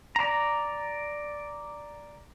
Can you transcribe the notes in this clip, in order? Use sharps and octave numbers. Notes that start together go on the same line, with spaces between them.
D5 A#5